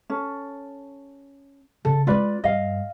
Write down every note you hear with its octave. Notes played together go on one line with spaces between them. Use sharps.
C#4 A4
C#3 A4
G#3 C#4 F4 B4 D5
G2 D#5 F5